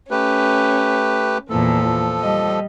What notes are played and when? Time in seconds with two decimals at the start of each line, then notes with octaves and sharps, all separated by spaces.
0.11 A3 C#4 G4 B4
1.50 E2 A#2 E3 F3 A4
2.21 G3 D#5